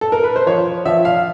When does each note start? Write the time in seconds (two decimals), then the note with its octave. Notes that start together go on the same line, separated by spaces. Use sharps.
0.01 A4
0.12 A#4
0.24 B4
0.36 C5
0.47 F3 C#5
0.85 F3 E5
1.05 F5